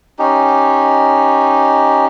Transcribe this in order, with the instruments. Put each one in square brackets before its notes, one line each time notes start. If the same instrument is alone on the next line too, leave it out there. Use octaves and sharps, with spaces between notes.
[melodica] C#4 D#4 G4